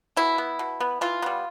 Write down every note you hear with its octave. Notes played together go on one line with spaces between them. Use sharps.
B2 E4
B3
B2
B3
E3 F4
G3 B3